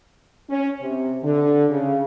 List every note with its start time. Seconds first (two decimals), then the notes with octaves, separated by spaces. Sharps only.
0.50 C#4
0.81 C3
1.23 D3
1.69 C#3